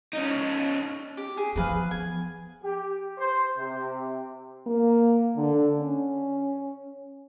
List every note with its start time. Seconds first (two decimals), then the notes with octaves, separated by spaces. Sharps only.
0.13 C#4 D#4
1.17 G4
1.37 G#4
1.56 F3 B3 G#4 B4 F5
1.91 G#5
2.63 G4
3.18 C5
3.56 C3
4.67 A#3
5.37 D3
5.79 C#4